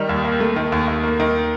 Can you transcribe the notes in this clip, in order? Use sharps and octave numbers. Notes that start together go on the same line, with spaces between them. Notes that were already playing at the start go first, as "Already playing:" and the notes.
Already playing: D#3 G3 D#4
D#2
A#3
A3
D#3
D#2
D#2
A#3
D#3